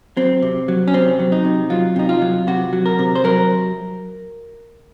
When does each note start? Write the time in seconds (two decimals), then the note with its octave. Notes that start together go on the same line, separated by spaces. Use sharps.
0.17 F#3 C4
0.42 C3
0.68 F#3
0.88 C#4
0.94 C3 C4
1.19 F#3
1.32 D#4
1.45 C3
1.70 F#3 F4
1.96 C3 D#4
2.09 F4
2.22 F#3
2.47 C3 F#4
2.73 F#3
2.86 A#4
2.99 C3
3.15 C5
3.24 F#3 A#4